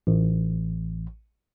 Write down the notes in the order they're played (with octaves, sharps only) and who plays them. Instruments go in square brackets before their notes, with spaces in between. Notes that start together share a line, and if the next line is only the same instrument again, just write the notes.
[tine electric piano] A1